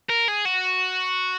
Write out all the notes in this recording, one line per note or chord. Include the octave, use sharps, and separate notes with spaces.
A#4
G#4
F#4